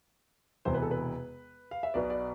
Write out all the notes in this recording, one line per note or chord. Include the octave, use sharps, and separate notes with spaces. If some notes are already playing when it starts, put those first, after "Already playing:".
E1 E2 C3 C5
B4
A4
B4
F5
E5
B1 B2 B3 D5
D5